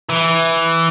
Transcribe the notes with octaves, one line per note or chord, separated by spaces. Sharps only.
E3